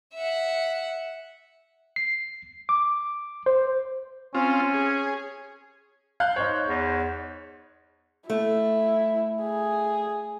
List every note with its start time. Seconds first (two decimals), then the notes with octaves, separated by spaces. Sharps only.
0.14 E5 F#5
1.96 C7
2.69 D6
3.46 C5
4.35 C4 C#4 F4
4.74 G#4
6.20 F5 F#6 G6
6.36 D#4 C5 C#5
6.68 E2
8.30 A3 E4
9.42 G#4